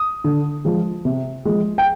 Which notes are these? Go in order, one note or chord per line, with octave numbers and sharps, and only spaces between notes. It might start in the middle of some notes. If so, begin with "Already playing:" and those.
Already playing: D#6
D3
F3 G#3
C3
F3 G#3
G5